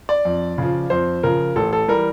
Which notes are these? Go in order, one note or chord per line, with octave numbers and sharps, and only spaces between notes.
D5
F2
C#3 F3
F2 C5
C#3 F3 A#4
A1 A4
A4
E3 G3 A#4